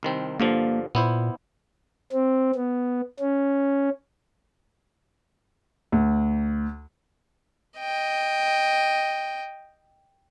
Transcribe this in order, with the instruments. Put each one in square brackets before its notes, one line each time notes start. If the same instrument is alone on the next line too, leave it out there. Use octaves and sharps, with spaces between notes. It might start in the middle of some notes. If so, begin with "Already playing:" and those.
[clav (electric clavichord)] C2 D#3 C4
[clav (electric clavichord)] G2 D3 F3 [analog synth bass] A#3
[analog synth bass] A#2 [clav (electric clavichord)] B3 E4 C5
[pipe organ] C4
B3
C#4
[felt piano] D2
[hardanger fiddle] D#5 G5